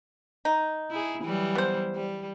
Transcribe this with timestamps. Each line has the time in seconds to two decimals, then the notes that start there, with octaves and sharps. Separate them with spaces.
0.45 D#4
0.91 E4 G#4
1.22 E3 F#3 G3
1.55 B3 C5
1.95 G3